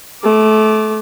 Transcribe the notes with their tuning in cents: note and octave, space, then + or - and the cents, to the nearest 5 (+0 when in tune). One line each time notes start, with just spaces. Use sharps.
A3 -25 D6 +0